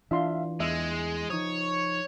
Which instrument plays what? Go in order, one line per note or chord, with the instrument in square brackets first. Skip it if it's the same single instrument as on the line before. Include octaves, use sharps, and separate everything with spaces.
[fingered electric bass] E3 [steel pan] D4 F4 C6 [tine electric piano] E5 F5
[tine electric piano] E2 [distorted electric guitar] G#3 [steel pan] E5
[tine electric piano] F3 D#4 [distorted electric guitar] C#5 [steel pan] D#6